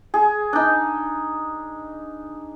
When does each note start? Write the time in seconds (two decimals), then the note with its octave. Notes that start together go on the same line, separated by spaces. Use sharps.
0.14 G#4
0.53 D4 D#4